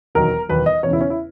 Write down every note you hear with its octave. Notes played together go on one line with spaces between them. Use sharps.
E1 D#2 D#3 F#3 A#4
E1 D#2 D#3 F#3 B4
D#5
E1 E2 C#3 C#5
E4
C#4
E4